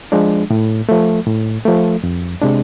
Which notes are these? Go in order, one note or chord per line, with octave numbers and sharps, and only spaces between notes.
F3 G#3 D4
A2
F3 A3
A2
F3 A3
F2
C3 G#3 D4